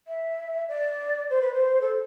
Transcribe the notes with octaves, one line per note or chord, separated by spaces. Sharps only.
E5
D5
C5
B4
C5
A4